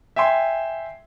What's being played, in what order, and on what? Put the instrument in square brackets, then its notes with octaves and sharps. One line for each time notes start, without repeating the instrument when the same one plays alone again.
[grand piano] E5 G5 G#5 C6